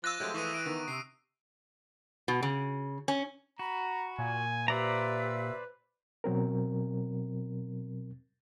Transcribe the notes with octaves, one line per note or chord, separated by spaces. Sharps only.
F3 F4 D6 E6 F#6 A#6 D#7
F3 F#3 G#3 A3 C4 G4
E3 C#6 D#6 D#7
D7
D#3 B3
C3 C7
B2
C#3
C#4
F#4 A#5 B5
A#2 G#5
G4 B4 C5 D5 E5 A#5 E6
B2 F#3 C4 A#4